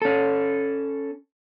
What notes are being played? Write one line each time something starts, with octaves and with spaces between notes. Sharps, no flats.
C#4 A4